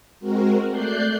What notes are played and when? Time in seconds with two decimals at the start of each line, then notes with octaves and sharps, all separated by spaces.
0.20 G#3 C4 F#4 A#4
0.69 A3 D5 F#6 G6 C7